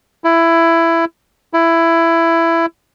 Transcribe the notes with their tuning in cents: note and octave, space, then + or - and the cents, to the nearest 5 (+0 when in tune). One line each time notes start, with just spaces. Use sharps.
E4 +15
E4 +15